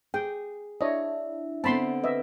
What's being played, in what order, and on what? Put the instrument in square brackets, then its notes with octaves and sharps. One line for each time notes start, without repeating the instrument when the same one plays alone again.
[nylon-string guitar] G#4 [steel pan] G5
[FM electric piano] D4 E4 [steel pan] C#5 D#5 [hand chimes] E5
[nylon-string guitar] D3 B3 C4 [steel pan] A5 B5 C6
[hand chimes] B4 [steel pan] D#5 E5